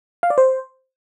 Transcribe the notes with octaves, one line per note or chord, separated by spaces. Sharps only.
F5
D5
C5